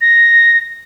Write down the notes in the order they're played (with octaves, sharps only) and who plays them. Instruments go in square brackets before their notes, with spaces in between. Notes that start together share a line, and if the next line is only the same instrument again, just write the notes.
[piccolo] A#6